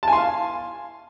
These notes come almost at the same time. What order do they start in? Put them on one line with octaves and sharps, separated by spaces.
A5 G#5 C6 F5